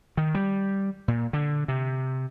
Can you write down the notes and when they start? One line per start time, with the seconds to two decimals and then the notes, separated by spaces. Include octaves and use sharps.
0.17 D#3
0.35 G3
1.08 A#2
1.33 D3
1.68 C3